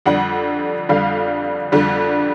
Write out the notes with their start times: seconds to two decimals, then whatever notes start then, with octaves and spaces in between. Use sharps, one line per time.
0.06 F2 D3 G3 F#5
0.89 F2 D3 G3 F5
1.72 F2 D3 G3